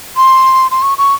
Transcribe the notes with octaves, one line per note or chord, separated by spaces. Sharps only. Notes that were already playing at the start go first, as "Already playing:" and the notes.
C6
C6
C#6
C#6